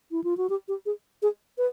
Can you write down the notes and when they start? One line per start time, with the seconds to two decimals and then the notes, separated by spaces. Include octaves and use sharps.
0.11 E4
0.24 F4
0.37 F#4
0.50 G4
0.68 G4
0.86 G#4
1.22 G#4
1.58 B4